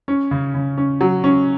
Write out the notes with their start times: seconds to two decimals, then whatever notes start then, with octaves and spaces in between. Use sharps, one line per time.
0.08 C#4
0.31 C#3
0.54 C#3
0.78 C#4
1.01 F#3
1.24 C#4